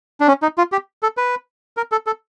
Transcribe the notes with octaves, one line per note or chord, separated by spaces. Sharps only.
D4
C#4
D#4
F4
G4
A4
B4
A#4
A4
A4